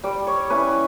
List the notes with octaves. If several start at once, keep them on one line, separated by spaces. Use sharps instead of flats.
G3 D5
C#5
C#4 E4 B4